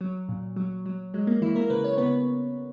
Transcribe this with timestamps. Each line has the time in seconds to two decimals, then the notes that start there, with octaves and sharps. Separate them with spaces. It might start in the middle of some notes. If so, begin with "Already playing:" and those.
0.01 F#3
0.29 A#2
0.56 F#3
0.86 F#3
1.14 F#3 G#3
1.27 A#3
1.42 E3 F#3 E4
1.55 A#3 A#4
1.70 C#3 B4
1.84 C#5
1.97 C#3 B3 B4